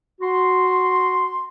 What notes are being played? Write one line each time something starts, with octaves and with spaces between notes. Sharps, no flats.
F#4 C6